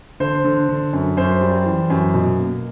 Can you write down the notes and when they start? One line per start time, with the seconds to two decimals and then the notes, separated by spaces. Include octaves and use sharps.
0.20 D3 C5
0.44 D3
0.68 D3
0.93 F#2
1.17 F#2 C5
1.41 G3
1.66 E3
1.90 F#2
2.14 B2
2.38 A#3